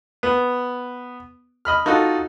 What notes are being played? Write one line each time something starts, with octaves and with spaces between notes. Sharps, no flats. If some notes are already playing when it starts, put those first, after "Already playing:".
B3
D#5 B5 F6
D#4 F4 F#4 A4